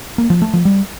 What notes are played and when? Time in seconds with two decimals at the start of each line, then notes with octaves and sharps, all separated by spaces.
0.18 A#3
0.30 F3
0.42 A3
0.53 F3
0.65 G3